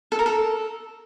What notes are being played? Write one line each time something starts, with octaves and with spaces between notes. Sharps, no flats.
A4
A#4
A4